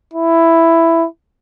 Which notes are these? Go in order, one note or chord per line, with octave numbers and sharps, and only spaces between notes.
E4